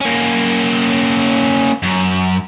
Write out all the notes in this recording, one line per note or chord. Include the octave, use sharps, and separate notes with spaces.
A#3 C#4
F#2